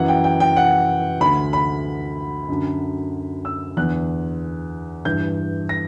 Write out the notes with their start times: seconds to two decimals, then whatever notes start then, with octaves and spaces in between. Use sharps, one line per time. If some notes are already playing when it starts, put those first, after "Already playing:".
Already playing: F#2 E3 F#5
0.08 G5
0.24 G5
0.40 G5
0.56 F#5
1.20 D2 D3 B5
1.53 B5
2.49 F#2 D3
3.45 E6
3.77 E2 D3 F#6
5.05 G2 E3 G6
5.69 A#6